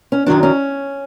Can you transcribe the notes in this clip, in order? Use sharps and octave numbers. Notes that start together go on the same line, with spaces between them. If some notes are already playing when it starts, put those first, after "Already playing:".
C#4
F#2 D#3 F#3 D4
C#4